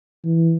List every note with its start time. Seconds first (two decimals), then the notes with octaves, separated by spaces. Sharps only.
0.25 E3